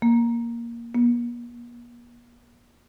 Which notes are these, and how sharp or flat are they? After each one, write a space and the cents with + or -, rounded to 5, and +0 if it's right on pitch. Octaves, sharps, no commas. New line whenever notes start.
A#3 +5
A#3 +45